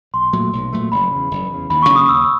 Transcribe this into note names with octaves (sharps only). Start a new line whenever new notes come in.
B1 C6
A#2 F#3 A3
B1
A#2 F#3 A3
F#1 B5
E2 C#3
F#1
E2 C#3
D#2 B5
C#6
C#3 F#3 A#3
D#6
D#2 E6